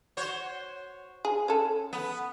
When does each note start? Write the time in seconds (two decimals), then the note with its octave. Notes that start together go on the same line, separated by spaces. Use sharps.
0.17 F#4 C5 C#5
1.25 G#4
1.48 C#4 A4
1.93 B3